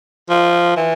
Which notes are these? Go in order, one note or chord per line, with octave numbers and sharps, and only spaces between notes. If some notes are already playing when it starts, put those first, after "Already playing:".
F3
E3